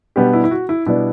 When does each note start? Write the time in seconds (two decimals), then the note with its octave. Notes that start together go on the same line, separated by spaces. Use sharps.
0.16 B2 G3 B3 D4 G4
0.33 E4
0.44 E4
0.51 F#4
0.69 E4
0.86 B2 G3 B3 D4 E4